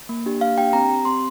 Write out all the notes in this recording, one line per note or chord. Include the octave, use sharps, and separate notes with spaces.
A#3
D4 G4
A#3 F5
D4 G4 G5
C4 A#5
G4
C4 C6